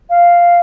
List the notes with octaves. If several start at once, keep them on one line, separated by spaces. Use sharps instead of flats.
F5